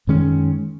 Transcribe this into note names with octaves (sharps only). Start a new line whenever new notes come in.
F#2 D#3 G#3 C#4